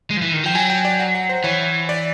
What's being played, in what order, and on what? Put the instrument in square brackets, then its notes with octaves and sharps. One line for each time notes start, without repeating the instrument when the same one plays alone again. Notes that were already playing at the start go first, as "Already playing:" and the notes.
[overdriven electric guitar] G#3
F3
E3
D#3
[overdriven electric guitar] F3 [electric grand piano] G5
[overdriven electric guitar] F#3 [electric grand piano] G#5
[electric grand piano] G5
D5
F#5
F#5
C5
[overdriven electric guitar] E3 [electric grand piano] C#5
[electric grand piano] D5